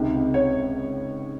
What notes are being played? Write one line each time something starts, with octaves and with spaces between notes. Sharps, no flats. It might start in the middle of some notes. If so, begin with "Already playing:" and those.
Already playing: C#2 C3 D#3
C#5